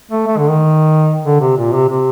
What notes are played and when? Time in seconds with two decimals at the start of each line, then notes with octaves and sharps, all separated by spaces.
0.11 A3
0.27 A3
0.38 D3
0.48 D#3
1.25 D3
1.41 C3
1.57 A#2
1.73 C3
1.89 C3